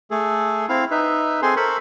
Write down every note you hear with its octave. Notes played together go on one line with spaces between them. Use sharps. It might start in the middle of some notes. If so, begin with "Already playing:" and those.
A3 G#4 A4
C4 E4 F5
D#4 B4 E5
C4 G#4 A4 C5 G#5 C6
A4 A#4 C5 B5 C#6